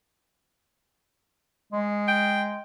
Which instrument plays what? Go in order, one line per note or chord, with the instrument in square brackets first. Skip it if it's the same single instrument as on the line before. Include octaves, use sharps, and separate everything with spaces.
[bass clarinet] G#3
[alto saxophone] G5